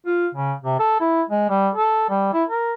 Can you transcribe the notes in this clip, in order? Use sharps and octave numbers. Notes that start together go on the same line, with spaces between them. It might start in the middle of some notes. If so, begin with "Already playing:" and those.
F4
C#3
C3
A4
E4
G#3
G3
A4
G3
E4
A#4